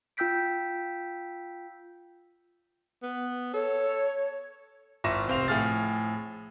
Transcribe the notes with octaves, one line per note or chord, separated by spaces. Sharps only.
F4 G5 E6 G6 B6 D7
B3
A4 C#5
G#1 E4 F4 C#6 A#6 E7
F1 C4 F5 F7
A2 F3 G#4 F6 A6